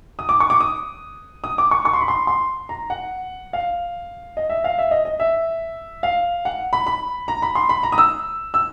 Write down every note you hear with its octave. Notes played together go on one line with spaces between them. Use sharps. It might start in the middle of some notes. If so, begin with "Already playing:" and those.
D#6
D6
C#6
D6
D#6
D#6
D6
C#6
C#6
C6
B5
C6
C6
A#5
F#5
F5
D#5
E5
F5
E5
D#5
D#5
E5
F5
F#5
B5
B5
A#5
B5
C6
B5
A#5
D#6
E6
E6